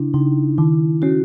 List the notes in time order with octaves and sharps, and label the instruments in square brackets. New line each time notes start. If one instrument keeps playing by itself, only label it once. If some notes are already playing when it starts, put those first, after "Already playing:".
Already playing: [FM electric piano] C#3 [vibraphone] D4 E4
[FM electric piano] C#3 [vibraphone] D#4
[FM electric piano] D#3 [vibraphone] E4
[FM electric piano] C#4 [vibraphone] F#4